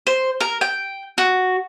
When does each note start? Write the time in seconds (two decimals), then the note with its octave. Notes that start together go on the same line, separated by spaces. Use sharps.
0.07 C5
0.40 A#4
0.61 G5
1.18 F#4